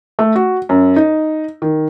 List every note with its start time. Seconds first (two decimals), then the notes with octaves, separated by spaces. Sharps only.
0.19 A3
0.35 F#4
0.69 F#2
0.96 D#4
1.62 D#3